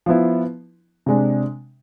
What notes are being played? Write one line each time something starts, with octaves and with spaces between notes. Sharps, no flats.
F3 B3 E4
C3 G#3 D4